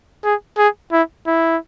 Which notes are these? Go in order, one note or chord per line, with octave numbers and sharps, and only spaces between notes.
G#4
G#4
E4
E4